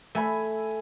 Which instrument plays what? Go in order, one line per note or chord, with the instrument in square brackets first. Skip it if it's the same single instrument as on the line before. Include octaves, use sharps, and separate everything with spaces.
[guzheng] A3 [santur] E5 G#5 B5